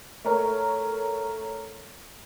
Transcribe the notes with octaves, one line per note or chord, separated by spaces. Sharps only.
A3 A#4 C#5